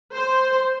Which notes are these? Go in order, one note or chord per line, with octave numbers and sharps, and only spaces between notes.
C5